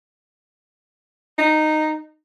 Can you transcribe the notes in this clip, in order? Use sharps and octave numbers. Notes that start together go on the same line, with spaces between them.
D#4